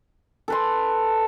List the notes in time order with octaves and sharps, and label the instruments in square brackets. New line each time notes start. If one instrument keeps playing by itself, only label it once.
[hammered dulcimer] A4 B4 C6